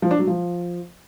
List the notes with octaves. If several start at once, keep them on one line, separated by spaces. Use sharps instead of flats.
F3
D4
F#3
F3